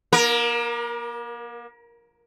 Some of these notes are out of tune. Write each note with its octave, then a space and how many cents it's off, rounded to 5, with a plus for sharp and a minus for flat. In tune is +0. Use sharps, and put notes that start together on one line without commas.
A#3 +40 A#4 +10